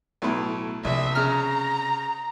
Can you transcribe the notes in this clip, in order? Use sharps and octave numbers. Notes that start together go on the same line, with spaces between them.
B1 A2
A#1 C3 E5
C#3 A#5 F6